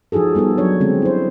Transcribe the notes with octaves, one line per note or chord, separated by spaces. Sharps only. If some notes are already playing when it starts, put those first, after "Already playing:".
F3 D#4 F#4 G#4 A4
G3 B3 D#4 A4
F#3 D4 C#5
D3 G#3 C4 C#4
E4 C5